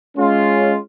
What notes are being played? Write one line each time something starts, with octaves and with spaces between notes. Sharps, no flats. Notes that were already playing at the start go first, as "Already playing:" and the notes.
G#3 C#4 F4